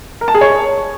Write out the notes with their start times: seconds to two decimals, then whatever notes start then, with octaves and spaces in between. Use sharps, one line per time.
0.21 A#4
0.28 A5
0.35 G#4
0.41 C#5